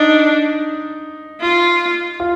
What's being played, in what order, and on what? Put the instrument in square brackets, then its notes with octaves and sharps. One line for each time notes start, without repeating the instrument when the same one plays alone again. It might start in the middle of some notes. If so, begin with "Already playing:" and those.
Already playing: [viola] D4 [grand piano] D#4
[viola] F4
[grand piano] F4